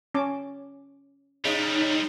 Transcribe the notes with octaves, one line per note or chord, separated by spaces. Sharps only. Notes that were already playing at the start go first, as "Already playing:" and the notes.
C#4 A5 D6
C#3 G3 G#3 D#4